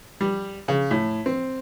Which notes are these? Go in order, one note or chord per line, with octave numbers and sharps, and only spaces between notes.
G3
C#3
A2
C4